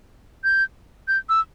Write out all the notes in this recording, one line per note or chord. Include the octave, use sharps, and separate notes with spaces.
G6
G6
E6